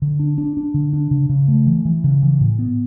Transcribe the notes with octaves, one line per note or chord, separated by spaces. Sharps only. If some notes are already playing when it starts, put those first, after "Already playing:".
D3
D4
D4
D4
D3
D4
C#3
C#3
A3
E3
E3
C#3
E3
A2
B3